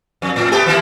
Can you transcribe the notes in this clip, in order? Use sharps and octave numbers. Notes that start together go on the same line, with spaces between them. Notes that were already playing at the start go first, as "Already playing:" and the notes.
F2
A2
A3 B3 G4
E3 A#3 E4